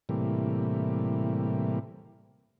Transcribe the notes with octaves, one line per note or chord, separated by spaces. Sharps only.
A2 C3 E3 G3 A#3